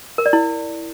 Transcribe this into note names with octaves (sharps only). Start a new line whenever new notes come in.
A#4
D5
E4